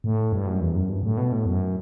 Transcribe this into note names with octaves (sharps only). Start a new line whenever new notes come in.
A2
G2
F#2
E2
F#2
G2
A2
B2
A2
F#2